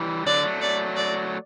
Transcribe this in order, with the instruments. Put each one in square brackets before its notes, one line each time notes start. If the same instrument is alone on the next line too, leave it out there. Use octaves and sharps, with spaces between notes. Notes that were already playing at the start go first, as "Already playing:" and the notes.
Already playing: [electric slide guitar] E3 G3
[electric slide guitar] D3 F#3 [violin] D5
[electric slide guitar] F#3 A3
[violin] D5
D5